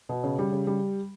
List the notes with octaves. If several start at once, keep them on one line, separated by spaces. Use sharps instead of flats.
B2
C#3
G3
C#3
G3